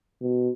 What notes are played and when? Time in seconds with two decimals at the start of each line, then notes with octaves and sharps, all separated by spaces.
0.22 B2